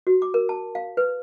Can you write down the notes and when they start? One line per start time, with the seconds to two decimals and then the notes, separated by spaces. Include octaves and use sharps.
0.07 F#4
0.22 D6
0.34 A#4
0.49 A5
0.75 F5
0.97 B4